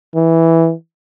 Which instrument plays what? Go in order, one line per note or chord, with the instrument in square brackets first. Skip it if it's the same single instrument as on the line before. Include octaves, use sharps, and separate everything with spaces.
[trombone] E3